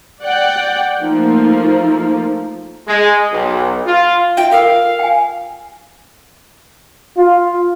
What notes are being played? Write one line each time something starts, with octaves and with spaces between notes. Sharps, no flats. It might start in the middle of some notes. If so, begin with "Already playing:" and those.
D5 F#5 G5
F3 A3 A#3 D#4
G#3
B1
F4
F4 E5 G5
F4 A4 A#4 F5
G5 G#5
F4